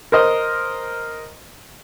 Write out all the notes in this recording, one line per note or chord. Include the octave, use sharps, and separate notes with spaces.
A#4 C5 D#5